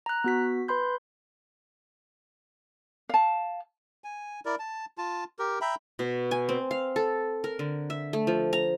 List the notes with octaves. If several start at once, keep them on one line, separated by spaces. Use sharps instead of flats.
A#5 F#6
B3 F#4 B6
B4 B5 C6 G6
F5 A5
G#5
E4 A#4 D5
A5
F4 A5
G4 A#4
E5 G5 A#5 B5
B2
G#5
C4
F5
A4
A#4
D3
E5
A3
F3
A#5